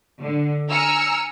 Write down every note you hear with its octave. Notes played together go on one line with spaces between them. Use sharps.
D3
G#5 A#5 E6 F6 C#7